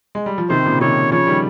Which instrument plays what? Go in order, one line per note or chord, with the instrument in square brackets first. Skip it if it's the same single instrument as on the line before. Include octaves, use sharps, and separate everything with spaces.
[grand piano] G#3
G3
F3
[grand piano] C3 D#3 [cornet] C5
[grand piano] A#2 C#3
[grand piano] C3 D#3 [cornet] C#5
[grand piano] C#3 F3 [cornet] C#5
[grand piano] D#3 G3